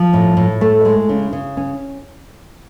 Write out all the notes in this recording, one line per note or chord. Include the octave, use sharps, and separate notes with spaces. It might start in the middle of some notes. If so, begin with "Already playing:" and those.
Already playing: F3
A2
A2
A3
G#3
C#3
C#3
C#4